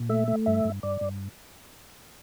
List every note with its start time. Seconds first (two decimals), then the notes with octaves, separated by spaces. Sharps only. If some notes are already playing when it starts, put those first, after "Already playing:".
Already playing: A#2
0.09 A3 E5
0.28 A3
0.46 G2 E5
0.65 G2
0.83 G2 D5
1.01 G2